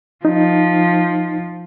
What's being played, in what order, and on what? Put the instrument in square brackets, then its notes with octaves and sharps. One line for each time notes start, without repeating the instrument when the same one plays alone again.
[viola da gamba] F3 [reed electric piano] D#4